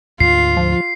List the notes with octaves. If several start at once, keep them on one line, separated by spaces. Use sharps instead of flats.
D2 G#2 F4 C7
F3